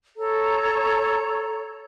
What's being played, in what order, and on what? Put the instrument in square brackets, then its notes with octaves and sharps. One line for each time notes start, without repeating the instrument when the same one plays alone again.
[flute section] A4 C#5 A#5